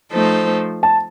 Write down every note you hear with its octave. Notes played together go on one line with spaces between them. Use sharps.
F3 A3 D#4 A4 C5
A5